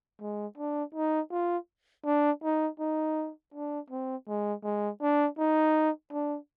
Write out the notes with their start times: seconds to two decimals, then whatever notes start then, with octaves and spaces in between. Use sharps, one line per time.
0.21 G#3
0.58 D4
0.95 D#4
1.32 F4
2.05 D4
2.43 D#4
2.80 D#4
3.54 D4
3.90 C4
4.28 G#3
4.64 G#3
5.02 D4
5.39 D#4
6.13 D4